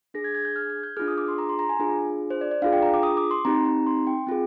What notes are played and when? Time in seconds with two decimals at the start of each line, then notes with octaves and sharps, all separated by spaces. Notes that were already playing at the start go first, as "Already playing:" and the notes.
0.14 D4 G#4 A#6
0.24 G#6
0.35 G#6
0.45 G6
0.56 F6
0.70 G#6
0.83 G6
0.97 D4 F4 G#4 F6
1.08 D#6
1.18 D6
1.28 C6
1.38 A#5
1.49 C6
1.59 A#5
1.69 G#5
1.80 D4 F4 G#4
2.30 C5
2.41 D5
2.51 D5
2.62 D4 F4 G#4 F5
2.73 G5
2.83 A#5
2.94 D6
3.03 D#6
3.17 D6
3.31 C6
3.45 C4 D#4 G4 A#5
3.65 A#5
3.87 C6
4.07 G5
4.27 C4 F4 G#4